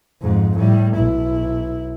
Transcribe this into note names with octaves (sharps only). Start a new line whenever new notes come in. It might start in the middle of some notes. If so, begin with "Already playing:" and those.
F2 G#2
A2 G3
B1 E4